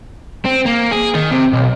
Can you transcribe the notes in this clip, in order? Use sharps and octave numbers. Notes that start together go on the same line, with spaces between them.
C4
A#3
G#4
D#3
C3
B1